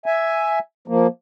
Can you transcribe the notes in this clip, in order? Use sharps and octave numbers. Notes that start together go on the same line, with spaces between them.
E5 G#5
F3 A#3